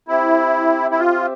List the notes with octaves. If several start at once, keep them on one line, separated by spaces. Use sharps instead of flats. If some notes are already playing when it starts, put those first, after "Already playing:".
C4 E4 G4 C5 E5
E4
F4